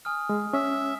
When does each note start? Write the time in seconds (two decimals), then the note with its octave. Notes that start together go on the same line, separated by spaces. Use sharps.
0.05 G#5 D#6 F6
0.29 G#3
0.53 C#4 E5